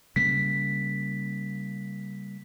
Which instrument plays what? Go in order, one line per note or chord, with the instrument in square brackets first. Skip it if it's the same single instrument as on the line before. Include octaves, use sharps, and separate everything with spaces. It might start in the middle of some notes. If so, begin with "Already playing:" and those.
[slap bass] C#3 G3 A#3 [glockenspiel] B6